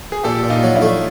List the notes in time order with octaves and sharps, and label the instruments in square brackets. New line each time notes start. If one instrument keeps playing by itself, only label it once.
[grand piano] G#4
[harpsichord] A#2 [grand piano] G4 A4
[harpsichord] A#2
[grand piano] D#4 F4
[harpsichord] F#3
[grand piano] D4 E4
[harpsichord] A3